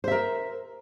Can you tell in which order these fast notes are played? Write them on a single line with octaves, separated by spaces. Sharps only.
C5 E5 A#4